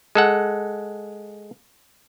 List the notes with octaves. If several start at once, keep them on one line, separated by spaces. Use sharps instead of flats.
G#3 A4 F#5